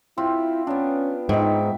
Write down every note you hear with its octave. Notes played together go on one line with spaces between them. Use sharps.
C4 E4 F4 G4
B3 C#4 D4
G#2 D#4 E5 G5